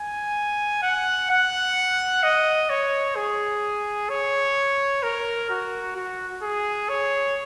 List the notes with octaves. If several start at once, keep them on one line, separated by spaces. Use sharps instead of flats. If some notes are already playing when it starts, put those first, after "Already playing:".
Already playing: G#5
F#5
F#5
D#5
C#5
G#4
C#5
A#4
F#4
F#4
G#4
C#5